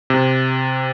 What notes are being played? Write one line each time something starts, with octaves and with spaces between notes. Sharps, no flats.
C3